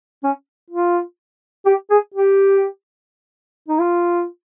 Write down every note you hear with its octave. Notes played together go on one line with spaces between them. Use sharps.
C#4
F4
G4
G#4
G4
D#4
F4